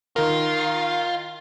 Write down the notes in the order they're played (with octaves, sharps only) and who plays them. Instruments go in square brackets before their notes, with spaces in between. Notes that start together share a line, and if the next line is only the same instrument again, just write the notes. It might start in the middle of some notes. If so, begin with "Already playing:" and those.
[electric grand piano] D#3 A#4 [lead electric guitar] F4